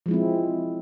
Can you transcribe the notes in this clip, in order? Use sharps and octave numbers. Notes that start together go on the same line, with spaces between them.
F3 G#3 C4 E4